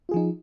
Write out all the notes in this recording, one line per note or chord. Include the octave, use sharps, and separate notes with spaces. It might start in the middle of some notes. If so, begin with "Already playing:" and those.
F3 D#4 F4 G#4